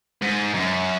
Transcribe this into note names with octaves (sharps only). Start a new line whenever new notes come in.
G#2
F#2